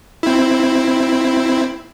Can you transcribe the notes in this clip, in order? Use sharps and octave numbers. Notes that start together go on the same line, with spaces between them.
C4 E4